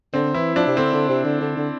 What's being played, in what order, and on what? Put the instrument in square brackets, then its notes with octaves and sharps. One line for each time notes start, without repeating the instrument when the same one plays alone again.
[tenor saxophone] D3 [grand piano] C4
[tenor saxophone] E3 [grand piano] E4
[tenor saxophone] F3 [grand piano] D4
[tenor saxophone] C3
[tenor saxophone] D3 [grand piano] C4
[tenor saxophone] D3
C3
D3
D3
D3